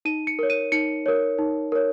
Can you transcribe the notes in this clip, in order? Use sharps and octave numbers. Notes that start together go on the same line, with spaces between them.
D#4 D#7
C#7
A#4 C#5
D#7
D#4 C#7
A#4 C#5
D#4
A#4 C#5